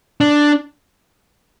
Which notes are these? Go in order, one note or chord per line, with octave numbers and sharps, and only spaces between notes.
D4